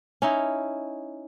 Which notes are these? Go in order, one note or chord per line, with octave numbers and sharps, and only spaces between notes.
C#4 D#4 E4